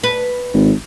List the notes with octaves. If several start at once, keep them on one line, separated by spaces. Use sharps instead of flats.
B4
G#1